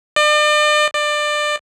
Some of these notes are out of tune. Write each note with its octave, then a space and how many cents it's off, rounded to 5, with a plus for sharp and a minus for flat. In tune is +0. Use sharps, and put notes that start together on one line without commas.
D5 +40
D5 +25